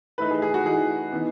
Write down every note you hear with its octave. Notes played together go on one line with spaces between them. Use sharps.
E3 A3 D#4 B4
G#4
G#4
F#4
E3 A3 D#4 G#4
E3 B3 D#4